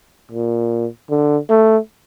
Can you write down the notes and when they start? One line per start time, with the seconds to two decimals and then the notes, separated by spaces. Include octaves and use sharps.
0.32 A#2
1.10 D3
1.50 A3